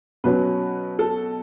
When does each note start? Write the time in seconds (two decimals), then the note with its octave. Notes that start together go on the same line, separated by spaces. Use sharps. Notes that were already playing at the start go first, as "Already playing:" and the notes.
0.24 B2 F#3 C#4 B4
0.99 A4